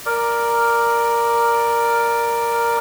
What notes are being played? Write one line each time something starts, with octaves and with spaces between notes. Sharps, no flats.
A#4 D5